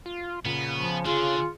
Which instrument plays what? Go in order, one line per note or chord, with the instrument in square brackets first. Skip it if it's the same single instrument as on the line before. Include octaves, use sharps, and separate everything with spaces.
[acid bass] F4
[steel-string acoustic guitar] A#2 [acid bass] C#3 [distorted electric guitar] B3
[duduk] F3
[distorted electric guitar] D3 [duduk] F4 [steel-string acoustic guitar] G#4